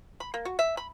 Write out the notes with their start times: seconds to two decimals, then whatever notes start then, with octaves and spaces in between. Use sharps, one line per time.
0.20 B5
0.34 A#3
0.45 F#4
0.59 E5
0.77 B5